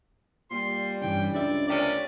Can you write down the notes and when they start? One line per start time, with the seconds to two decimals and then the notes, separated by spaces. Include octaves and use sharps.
0.51 A#2 G3 C6
1.02 G2 E3 C#4 G5
1.34 C#2 D4 D5 E5
1.68 C3 A#3 C#4 D5